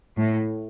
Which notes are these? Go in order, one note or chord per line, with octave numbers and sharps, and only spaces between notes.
A2